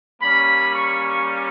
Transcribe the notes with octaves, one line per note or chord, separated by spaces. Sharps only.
G3 A#3 C#4 B5
C#6